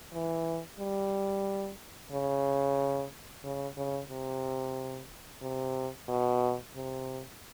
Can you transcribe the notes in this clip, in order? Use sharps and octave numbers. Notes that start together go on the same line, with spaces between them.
E3
G3
C#3
C#3
C#3
C3
C3
B2
C3